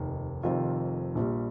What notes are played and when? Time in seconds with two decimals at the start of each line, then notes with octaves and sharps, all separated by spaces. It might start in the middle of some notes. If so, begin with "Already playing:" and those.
Already playing: F1 D#2 D#3
0.43 F1 F2 D#3 C4 F4
1.15 A#1 A#2 G3